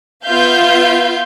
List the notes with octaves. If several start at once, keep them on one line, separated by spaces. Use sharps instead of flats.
B3 F4 E5 F5 G6